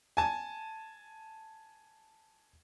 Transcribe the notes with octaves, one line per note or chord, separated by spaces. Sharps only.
G#5 A5